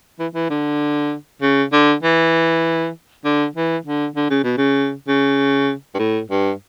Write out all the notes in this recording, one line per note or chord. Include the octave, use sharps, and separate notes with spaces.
E3
E3
D3
C#3
D3
E3
D3
E3
D3
D3
C#3
B2
C#3
C#3
G2
A2
G2